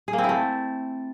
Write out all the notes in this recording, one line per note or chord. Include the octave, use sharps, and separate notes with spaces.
G#4
A#3
C4
E4
A3